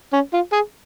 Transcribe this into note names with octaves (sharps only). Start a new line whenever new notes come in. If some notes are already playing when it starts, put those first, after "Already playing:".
C#4
F4
G#4